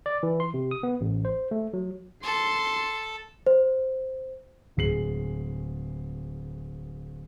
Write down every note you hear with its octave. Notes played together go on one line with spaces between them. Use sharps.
D5
E3
C6
C3
D#6
B3
A1
C5
A3
F#3
A4 C6
C5
D1 G#3 C7 F#7